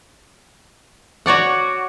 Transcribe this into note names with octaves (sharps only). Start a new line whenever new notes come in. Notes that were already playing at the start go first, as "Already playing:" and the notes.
F#4 C#5 D5 F#5